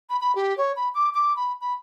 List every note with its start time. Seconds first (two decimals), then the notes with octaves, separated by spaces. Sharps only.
0.10 B5
0.21 B5
0.35 G4
0.58 C#5
0.76 B5
0.95 D6
1.14 D6
1.36 B5
1.61 B5